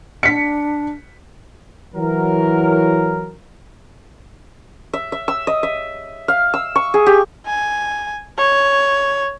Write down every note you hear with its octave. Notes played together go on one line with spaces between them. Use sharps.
D4 B6 C#7
E3 F#3 A#4
E5
E5
E6
D#5
E5
F5
E6
C#6
G#4
G4
G#5
C#5